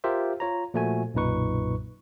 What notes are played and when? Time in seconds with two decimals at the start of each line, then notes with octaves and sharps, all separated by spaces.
0.04 F4 G4 A#4 C5 E5
0.40 F4 C#5 A#5
0.74 A#2 F3 A3 F#4 G#5
1.14 B1 F#2 A#2 D#4 B4 C#6